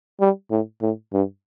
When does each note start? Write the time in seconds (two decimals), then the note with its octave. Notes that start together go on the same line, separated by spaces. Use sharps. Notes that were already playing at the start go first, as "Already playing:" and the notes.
0.20 G3
0.51 A2
0.81 A2
1.13 G2